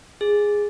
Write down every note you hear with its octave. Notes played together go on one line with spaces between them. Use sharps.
G#4